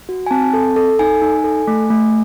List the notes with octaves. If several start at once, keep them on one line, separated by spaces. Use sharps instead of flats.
F#4
G#5
C4 A5
A4
A4
D#4 G#5
D#4
A4
A3
A3